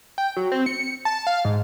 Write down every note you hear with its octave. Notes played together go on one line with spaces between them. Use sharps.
G5
F#3
C4
C#7
A5
F5
G#2